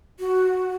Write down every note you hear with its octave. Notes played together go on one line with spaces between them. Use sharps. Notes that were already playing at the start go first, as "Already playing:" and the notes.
F#4